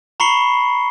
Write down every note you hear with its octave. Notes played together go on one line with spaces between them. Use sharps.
A#5 B5 C#6 C7 C#7 G7